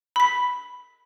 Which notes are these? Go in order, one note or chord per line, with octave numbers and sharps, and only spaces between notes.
B5 B6